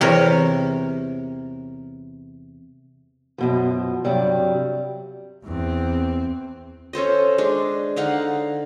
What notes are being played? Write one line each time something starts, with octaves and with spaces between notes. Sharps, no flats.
E2 C3 A#4 C#5
F#2 B2 F3
G2 C3 F#3 G3
E2 C4
C#4 A4 C5 D#5
G#3 D4
D3 D#4 F5 F#5